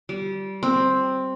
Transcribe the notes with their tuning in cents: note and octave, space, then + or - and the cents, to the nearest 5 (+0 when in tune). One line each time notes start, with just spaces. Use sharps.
G3 -20
C4 +5